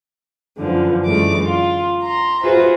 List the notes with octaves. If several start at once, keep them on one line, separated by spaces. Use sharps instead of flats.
F#2 D3 E3 F3
F#2 D3 E3 G#3 A3 D6
F4
A#5 C6
F4 F#4 G#4 B4 C5 E5